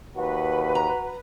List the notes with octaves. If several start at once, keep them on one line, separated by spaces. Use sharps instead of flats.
D#2 F#4 B4
A#5